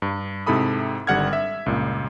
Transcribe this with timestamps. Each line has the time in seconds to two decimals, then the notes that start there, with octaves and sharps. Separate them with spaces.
0.02 G2
0.46 G#2 C3 E4 A4 B5 D#6
1.07 G#1 D3 G3 F#5 F6 G#6
1.33 E5
1.66 C#2 G2 A#2